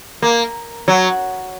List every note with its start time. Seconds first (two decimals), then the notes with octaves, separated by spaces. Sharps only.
0.22 A#3
0.88 F#3